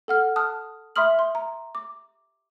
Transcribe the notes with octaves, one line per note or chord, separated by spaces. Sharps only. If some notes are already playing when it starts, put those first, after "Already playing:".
A4 F#5 F6
A5 D#6 F6 F#6
E5 B5 C6 D#6 F6 F#7
C6
A#5
D6